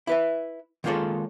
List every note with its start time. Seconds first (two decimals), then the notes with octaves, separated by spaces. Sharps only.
0.07 E4 B4 E5
0.84 D#3 G#3 A#3 F4 A4 C#5